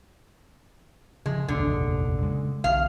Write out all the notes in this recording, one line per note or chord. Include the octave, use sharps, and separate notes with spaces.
C#3 F3 G#3
F1 A#1 D#2 D3
C#3 G#3
B1 B2 D#3 F5